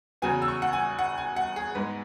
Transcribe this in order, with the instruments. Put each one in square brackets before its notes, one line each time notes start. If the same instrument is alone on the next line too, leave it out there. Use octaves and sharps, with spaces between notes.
[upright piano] E2 C#3 F#3 B3 G#5
E6
C#6
F#5
G#5
F#5
G#5
F#5
G#4
G#2 G#3 B3 B4